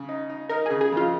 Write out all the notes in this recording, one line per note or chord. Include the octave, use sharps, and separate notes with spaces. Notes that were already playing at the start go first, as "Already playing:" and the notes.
Already playing: C#3
D#4
D#4
D#4 A#4
C#3 G#4
G#4
F2 F4